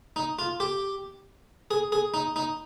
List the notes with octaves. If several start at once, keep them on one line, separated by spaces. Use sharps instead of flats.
D#4
F4
G4
G#4
G#4
D#4
D#4